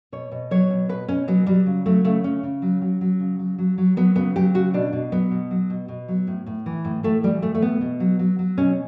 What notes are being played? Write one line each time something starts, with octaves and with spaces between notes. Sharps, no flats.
B2 C#5
B2
F#3 C#5
B2
B2 B4
B2 C#4
F#3 B3
F#3 G3
C#3
F#3 A3
C#3 A3
C#3 C#4
C#3
F#3
F#3
F#3
C#3
F#3
F#3
F#3
F#3 B3
C#3 B3
F#3 G4
C#3 F#4
B2 D4
B2
F#3 B3
B2
F#3
B2
B2
F#3
A2
A2
E3
A2
A2 A3
E3 G3
A2 A3
A3
A2 B3
B2
F#3
F#3
F#3
B2 C#4